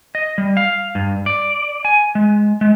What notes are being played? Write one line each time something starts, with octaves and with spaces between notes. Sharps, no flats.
D#5
G3
F5
G2
D5
G#5
G#3
G#3